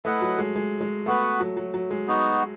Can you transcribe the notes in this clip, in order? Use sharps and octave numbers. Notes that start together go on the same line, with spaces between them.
A3 E4 B4 D#5 F#5
F#3
G#3
G#3
G#3
A3 B3 F#4 B4
F#3
F#3
F#3
G#3
B3 D#4 F#4